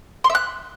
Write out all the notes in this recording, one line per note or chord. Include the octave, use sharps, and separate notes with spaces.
C6
E5
F#6